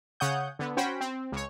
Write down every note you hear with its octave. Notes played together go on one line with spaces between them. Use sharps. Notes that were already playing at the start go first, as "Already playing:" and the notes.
C#3 C#5 F#5 D#6 G6
D3 B3
C#4 F#4 C5 G5 B5
C4
C#2 C#5